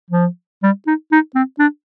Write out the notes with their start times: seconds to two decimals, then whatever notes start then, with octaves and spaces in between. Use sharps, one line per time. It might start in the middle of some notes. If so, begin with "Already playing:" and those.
0.11 F3
0.63 G3
0.87 D#4
1.12 D#4
1.35 C4
1.59 D4